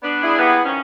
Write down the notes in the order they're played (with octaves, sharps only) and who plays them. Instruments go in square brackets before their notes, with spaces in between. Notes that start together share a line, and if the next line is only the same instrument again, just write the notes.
[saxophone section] B3 D4
[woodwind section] E4 G#4
[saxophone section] G3 A#3 B3
D#3 F3 C#4